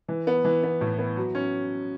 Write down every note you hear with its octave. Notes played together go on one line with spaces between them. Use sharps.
E3
B3
E3
B3
A2
B3
F#3
C#4